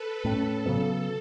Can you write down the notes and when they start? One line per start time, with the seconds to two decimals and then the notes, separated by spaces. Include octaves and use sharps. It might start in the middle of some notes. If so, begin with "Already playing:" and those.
Already playing: A4 B4
0.24 A2 A3 C#4 A4
0.66 C#3 F#3 B3